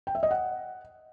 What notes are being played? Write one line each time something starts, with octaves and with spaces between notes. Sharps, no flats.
G5
E5
D#5
F#5